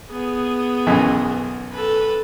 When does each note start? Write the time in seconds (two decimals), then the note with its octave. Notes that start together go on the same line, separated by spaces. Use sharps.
0.11 B3 G#4
0.87 B1 F#2 E3
1.72 A4 B4